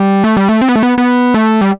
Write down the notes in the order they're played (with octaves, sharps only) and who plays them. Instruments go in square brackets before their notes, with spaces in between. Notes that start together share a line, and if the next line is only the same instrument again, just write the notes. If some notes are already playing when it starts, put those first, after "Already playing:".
Already playing: [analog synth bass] G3
A3
G3
A3
C4
B3
A3
B3
B3
A3
G3